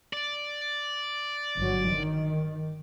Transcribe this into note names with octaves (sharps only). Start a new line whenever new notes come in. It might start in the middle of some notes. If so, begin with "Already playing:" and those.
D5
G1 F#3
D#3